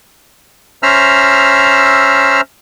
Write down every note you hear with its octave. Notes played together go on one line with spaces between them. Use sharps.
C#4 C5 E5 A#5 E6 F6